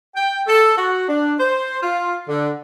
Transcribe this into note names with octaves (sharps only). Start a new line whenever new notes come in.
G5
A4
F#4
D4
C5
F4
D3